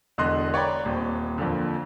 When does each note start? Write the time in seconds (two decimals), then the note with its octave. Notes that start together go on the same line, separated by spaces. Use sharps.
0.18 E1 E2 D3 D#5 C6 F#6
0.54 C#5 D5 G5 A#5 B5
0.85 D#1 C4
1.38 F2 A#2 D3